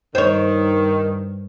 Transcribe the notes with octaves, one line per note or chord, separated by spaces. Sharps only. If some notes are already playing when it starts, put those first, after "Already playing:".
G2 D#3 C5 C#5